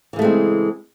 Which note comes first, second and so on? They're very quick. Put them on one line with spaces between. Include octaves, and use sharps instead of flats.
E3 C#3 A3 G#3 C4